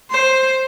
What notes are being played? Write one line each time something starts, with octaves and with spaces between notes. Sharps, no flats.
C5